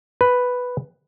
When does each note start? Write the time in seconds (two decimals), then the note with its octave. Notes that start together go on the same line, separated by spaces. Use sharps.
0.21 B4